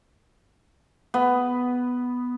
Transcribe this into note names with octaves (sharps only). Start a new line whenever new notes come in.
B3